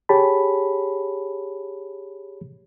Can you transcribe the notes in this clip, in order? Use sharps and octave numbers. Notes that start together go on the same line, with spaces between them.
G4 G#4 C#5 A5 B5